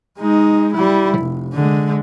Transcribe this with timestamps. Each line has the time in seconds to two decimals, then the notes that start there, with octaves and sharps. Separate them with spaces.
0.18 G#3 D#4
0.74 G3 E4
1.19 F1
1.53 D3 G#3